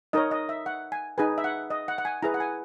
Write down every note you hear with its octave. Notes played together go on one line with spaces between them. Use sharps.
D#4 A#4 C#5 D#5
D#5
E5
F#5
G#5
D#4 G#4 B4 G#5
E5
F#5
D#5
F#5
F#5
G#5
E4 G#4 B4 A#5
F#5
G#5